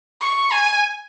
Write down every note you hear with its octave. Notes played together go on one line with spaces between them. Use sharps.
C#6
G#5